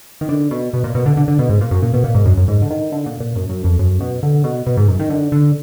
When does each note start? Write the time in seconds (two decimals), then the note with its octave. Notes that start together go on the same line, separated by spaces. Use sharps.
0.21 D#3
0.29 D3
0.51 B2
0.73 B2
0.84 A#2
0.95 B2
1.06 D3
1.17 D3
1.28 D3
1.39 B2
1.49 G#2
1.61 A#2
1.71 F#2
1.82 A#2
1.94 B2
2.04 A#2
2.15 G#2
2.25 F#2
2.37 F#2
2.48 G#2
2.62 D3
2.70 D#3
2.92 D3
3.06 A#2
3.20 A#2
3.36 F#2
3.49 F#2
3.64 F2
3.79 F#2
4.00 B2
4.23 D3
4.44 B2
4.67 B2
4.77 G#2
4.88 F#2
4.99 D#3
5.10 D3
5.32 D3